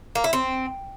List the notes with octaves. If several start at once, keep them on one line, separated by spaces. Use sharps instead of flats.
A#3
E4
C4